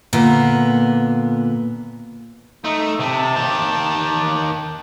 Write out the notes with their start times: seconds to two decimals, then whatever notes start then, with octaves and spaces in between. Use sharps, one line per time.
0.13 A#2 D3 B3
2.64 A3 D#4
3.00 C3 A5
3.36 D#3 G4